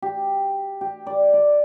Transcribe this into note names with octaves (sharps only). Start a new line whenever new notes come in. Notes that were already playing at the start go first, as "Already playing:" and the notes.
G4
G4
D5
D5